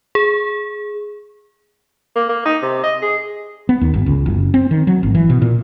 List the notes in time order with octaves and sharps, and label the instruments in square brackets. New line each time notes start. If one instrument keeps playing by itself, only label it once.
[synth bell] G#4
[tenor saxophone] A#3
A#3
D#4
C3
D#5
G#4
[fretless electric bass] B3
D#2
G1
C#2
F#1
C4
D#3
F#3
G#1
E3
B2
A#2